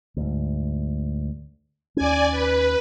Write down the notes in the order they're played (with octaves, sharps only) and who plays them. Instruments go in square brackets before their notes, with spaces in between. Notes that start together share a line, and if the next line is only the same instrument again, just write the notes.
[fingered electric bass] D2 G#2
[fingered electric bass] D#2 C#4 [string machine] D5 G#5
[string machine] B4